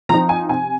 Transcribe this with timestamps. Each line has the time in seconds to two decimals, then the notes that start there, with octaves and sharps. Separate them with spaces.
0.09 F3 C4 D#4 A#5
0.29 G#5
0.49 C3 G#5